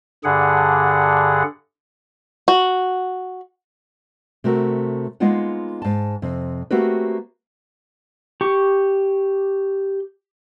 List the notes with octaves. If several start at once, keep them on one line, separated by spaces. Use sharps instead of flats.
G2 D3 G#4 F#5
F#4
C3 A3 F#4 A#4
G#3 A#3 B3 D#4 F4 F#5
G#2 A5
F2 C3
A3 A#3 C4 F#4 G4 B4
G4 C#6